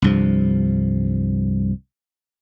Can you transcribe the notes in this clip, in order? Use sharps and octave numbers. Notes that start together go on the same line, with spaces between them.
C2 G2 F3